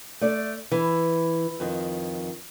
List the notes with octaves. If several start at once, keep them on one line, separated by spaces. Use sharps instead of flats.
A3 D5
E3
F2 D#3